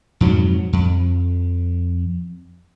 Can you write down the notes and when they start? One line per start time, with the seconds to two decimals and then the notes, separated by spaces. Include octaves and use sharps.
0.21 F2 G#2 B2 F#3
0.73 F2